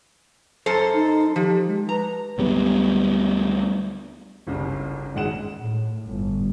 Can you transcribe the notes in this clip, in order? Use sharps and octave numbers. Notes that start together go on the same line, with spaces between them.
F#2 A4 C5
D#4
F3 G4
G#3
B4 A#5
D2 F#3 G3 B3
G1 C2 C#3
D#1 G#1 G#3 F#5 E7
A2
G1